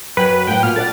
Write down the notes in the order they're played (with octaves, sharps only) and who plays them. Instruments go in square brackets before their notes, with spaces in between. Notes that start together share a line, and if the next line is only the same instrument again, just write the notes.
[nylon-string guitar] F#2 F#3 G5 [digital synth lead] B4
[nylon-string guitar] A2 F#5 [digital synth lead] G5
[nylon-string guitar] A#2 [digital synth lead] F6
[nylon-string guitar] A4 D5 F#5 [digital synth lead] A6